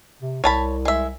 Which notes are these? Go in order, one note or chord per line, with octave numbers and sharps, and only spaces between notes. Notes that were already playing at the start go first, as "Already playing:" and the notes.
C3
C2 C#5 A5 B5
G#3 E5